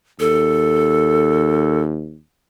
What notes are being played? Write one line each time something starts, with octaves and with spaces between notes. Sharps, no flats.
D#2 A4